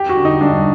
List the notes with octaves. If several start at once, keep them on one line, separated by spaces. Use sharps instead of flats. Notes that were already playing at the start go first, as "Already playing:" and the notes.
Already playing: G4
F#4
D3
D#4
G2 D4